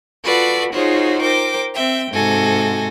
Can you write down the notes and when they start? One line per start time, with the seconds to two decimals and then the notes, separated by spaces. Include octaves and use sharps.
0.24 F4 F#4 A4 B4 D5 B5
0.73 D#4 F4 F#4 G#4 C5 C#5
1.22 A#4 C5 G5 D6
1.74 C4 E5 G5
2.12 G#2 C3 F#4 A4 G#5 A#6